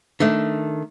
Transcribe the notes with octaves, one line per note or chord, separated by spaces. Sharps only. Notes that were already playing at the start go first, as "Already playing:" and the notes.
D#3 A3 D4